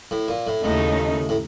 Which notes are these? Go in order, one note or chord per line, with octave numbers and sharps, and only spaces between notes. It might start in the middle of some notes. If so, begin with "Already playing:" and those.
A2
A#2
A2
D#2 A2 C#3 A3 D#4
A2